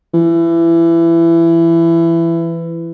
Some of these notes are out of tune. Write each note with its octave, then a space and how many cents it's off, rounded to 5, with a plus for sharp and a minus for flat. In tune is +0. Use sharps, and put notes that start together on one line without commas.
E3 +20